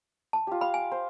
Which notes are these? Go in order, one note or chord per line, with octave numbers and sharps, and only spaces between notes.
A5
F4 G4
F5 B5
G#5
C5